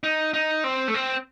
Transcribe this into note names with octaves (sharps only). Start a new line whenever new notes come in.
D#4
D#4
C4
A3
C4